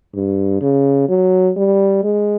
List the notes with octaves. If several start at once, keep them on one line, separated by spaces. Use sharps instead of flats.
G2
C#3
F#3
G3
G#3